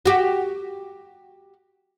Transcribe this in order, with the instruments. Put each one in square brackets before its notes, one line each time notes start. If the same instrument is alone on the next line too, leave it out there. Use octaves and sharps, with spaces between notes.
[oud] F#4 G4